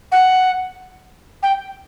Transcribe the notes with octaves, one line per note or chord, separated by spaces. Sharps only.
F#5
G5